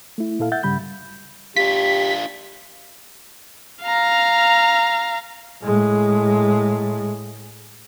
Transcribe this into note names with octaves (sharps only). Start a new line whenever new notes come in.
A3 E4
A#2 E4 A4 F5
E5 F#5 G6 A6
G2 C#3 G3 B5 G6
D4 F4 G4 B6
F5 A#5
A2 G#3